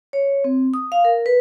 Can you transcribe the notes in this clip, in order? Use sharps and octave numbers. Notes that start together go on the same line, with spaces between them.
C#5
C4
D#6
F5
A#4
B4